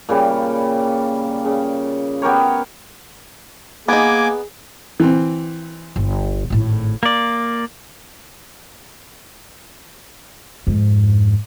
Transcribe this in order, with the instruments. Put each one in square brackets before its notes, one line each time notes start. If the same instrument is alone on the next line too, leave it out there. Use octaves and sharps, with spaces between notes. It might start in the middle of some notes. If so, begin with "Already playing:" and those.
[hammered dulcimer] A#2 C#3 G3
C#3
B3 G4 A#4 C#5
[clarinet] A#3 [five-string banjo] B3 D#4 [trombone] G#4 [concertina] G#5 D6
[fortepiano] E3 C4
[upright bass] G1
G#1 A2
[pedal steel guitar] A#3 D5
[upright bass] F2 G#2